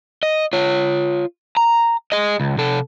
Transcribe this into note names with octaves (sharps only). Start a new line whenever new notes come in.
D#5
F4 C#5
A#5
G#4 D#5
C#2
C3 A4